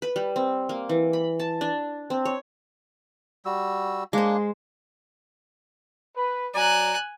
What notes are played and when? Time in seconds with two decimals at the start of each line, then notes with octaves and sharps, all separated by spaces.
0.02 B4
0.16 G3
0.36 C4
0.69 A#3
0.89 E3
1.13 B5
1.40 A5
1.61 D4
2.10 C4
2.25 C#5
3.45 G3 F#4 E6
4.13 G#3 A#3 D4 C5
6.16 B4
6.55 F#3 D5 G#5 A#5 F#6